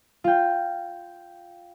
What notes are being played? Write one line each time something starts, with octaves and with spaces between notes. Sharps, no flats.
F4 G5